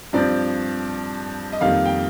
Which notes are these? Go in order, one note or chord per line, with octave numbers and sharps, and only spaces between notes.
G2 F3 C4 D5
D#5
F2 D#3 G3 A#3 F5
G5